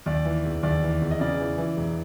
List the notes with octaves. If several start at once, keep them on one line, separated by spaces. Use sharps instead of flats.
D#2 D5
E3
E1
D#2 D5
E3
E1
D#5
C#3 D5
E3
E3
E1